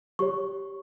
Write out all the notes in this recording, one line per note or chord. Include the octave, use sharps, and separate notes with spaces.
G4 C#5 C#6